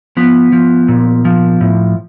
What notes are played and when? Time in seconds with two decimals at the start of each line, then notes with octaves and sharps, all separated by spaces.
0.17 F3 B3
0.52 F3
0.88 A#2
1.25 F3
1.61 A2